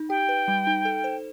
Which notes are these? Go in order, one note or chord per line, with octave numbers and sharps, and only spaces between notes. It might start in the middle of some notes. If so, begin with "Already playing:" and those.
Already playing: D#4
G4 G5
B4
G3
D#4
A4
C5